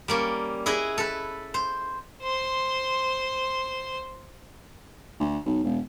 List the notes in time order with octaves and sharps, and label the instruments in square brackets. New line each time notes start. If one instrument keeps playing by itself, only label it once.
[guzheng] G3 A#3 C#4
E4 G#4 B4 D#5
A4 B4
C5
[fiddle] C5 C6
[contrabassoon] D2
B1
E1